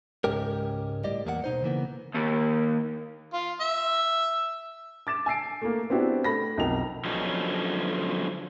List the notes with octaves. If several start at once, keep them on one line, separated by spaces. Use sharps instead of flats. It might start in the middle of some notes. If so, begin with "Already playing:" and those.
C#2 G#2 C#4 D#4 G4 A#4
A2 G3 G4 D5 D#5
E2 A#3 G#4 F#5
B2 D#4 C5
C#3 E3 A#3 B3
D#2
F4
E5
D6 A6 E7
G#5 E6 C7 D7
A3 A#3
B3 C4 D4 E4 F#4 G4
A3 B5 A#6
B1 F2 F3 A#4 G5 F7
D3 F3 F#3 B3 C#4 D#4